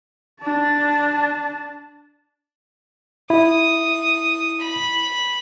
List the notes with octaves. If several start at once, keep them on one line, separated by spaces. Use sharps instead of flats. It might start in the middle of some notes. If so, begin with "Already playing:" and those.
D4 A5
E4 D#6
B5